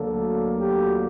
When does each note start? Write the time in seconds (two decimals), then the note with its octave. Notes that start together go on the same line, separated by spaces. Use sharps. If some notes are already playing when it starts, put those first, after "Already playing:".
Already playing: D2 D3 F#3 A#3 A4
0.60 G4